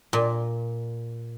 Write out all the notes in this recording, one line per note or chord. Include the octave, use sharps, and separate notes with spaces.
A#2